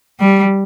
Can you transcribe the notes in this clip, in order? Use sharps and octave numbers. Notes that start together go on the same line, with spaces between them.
G3